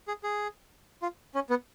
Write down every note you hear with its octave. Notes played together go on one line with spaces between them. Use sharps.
G#4
G#4
F4
C#4
B3